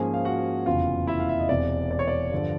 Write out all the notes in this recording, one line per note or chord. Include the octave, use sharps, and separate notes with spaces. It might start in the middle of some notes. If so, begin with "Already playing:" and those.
Already playing: G#2 F3 A#3 C#4 G#4 G#5
F5
F#4 F#5
F1 E2 C#3 F4 F5
E4 E5
F5
E5
D#5
E1 E2 C3 D5
D5
C#5
D5
G2 D3 F3